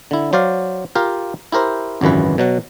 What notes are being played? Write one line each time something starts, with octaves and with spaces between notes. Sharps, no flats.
D3 E4
F#3 C5 D5 F5
F4 G4 A#4 F5
E4 G4 A#4 C5
G#1 C#2 F#2 E3 B4
B2 F#3 F#5